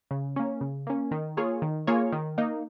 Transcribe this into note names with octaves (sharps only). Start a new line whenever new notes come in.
C#3
A#3 C#4
C#3
A#3 C#4
D#3
A#3 F4 G#4 C#5
D#3
A#3 F4 G#4 C#5
D#3
A#3 D#4